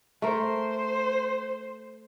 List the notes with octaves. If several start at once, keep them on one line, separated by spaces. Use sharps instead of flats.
A3 A#4 C5